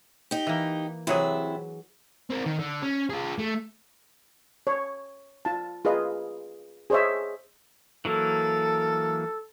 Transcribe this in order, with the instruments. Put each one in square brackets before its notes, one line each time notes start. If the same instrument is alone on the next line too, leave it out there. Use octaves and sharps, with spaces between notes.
[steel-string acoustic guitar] D#4 G4
[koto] E3 A#3
[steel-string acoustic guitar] C3 E4 E5 [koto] E3 F#3 G#4
[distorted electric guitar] C4 A#4
D#3
D3
C#4
F4 G#4
A3
[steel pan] C#5
F4 A5
F4 G#4 B4 D#5
G#4 C5 C#5 D#5 E5
[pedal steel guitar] E3 F#3 A#3 [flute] A4